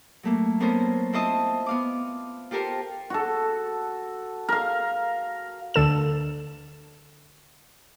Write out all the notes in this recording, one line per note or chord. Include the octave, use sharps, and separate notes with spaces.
F#3 A3 A#3
A#3 B3 C#4 A4 A#4 C5
C4 E4 F4 C5 D#5 A5
B3 F5 D6
F4 G4 A4 A#4 C5 F5
F#4 A4
A#4 F5
D2 D3 A4 E7